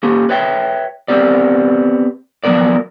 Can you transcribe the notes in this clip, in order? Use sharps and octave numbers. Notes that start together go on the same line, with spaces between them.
A#3 C#4 G4
B4 C#5 E5 G5
B3 C4 G4 D5
F3 F#3 G#3 B3 A#4 D5